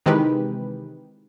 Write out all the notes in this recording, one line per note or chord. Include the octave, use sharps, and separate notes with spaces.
C3 D#3 E3 G#3 G4 B4